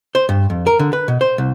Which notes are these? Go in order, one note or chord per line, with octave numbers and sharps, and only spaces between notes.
C5
G2
F2
A#4
D3
B4
B2
C5
C2